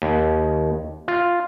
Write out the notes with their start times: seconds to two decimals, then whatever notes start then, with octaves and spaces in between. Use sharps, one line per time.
0.02 D#2
1.08 F4